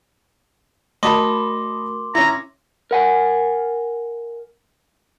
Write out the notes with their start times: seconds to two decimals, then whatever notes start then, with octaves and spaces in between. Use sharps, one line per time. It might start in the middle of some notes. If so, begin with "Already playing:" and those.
1.03 A3 F#4 A#4 D#5 A5 B5 C6 D6
2.15 C#4 E4 A#5
2.91 A#4 F#5 G#5